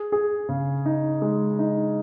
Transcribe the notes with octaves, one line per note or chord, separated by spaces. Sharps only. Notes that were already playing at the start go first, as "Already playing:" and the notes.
Already playing: G#4
G#4
C#3
D#4
G#3
D#4